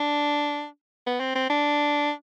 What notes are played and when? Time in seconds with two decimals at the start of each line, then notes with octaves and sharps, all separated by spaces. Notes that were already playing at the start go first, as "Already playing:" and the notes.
Already playing: D4
1.06 B3
1.20 C4
1.35 C4
1.50 D4